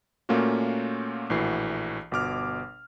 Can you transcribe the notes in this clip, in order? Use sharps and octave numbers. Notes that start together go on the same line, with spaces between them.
A#2 A3 A#3 C#4 F4 F#4
A#1 A2 E3 F#4 C7
G1 B2 D6 F6